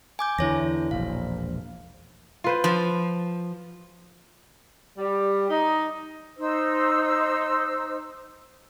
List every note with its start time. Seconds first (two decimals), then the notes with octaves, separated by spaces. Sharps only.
0.19 G#5 D6 G6
0.39 E2 D3 E4 C#5 A#6
0.91 E1 A#1 F5
2.44 F4 B4 C5
2.64 F3
4.98 G3
5.50 D#4
6.37 D#4 C5 E6